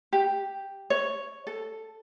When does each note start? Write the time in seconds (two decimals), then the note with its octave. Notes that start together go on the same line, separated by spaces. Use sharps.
0.13 G4
0.90 C#5
1.47 A4